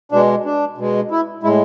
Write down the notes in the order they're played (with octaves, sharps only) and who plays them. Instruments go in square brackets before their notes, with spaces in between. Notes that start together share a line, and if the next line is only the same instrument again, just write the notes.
[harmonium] B2 G#3 D4
D4
B2 G#3
E4
A2 G#3 E4